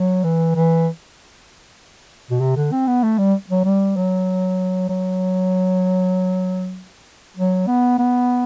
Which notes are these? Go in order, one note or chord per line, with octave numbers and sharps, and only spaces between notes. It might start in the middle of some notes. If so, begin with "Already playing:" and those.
Already playing: F#3
E3
E3
B2
C3
D3
C4
B3
A3
G3
F#3
G3
F#3
F#3
F#3
B3
B3